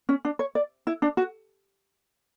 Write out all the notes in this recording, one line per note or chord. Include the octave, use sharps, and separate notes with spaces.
C#4
D4
C#5
D5
E4
D4
F#4